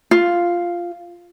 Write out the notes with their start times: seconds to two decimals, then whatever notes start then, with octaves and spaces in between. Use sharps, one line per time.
0.11 F4